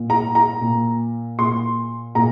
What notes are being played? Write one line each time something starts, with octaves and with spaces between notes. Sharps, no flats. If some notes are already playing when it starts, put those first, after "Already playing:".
Already playing: A#2
A#5
A#5
A#2
A#2 C6
A#2 A#5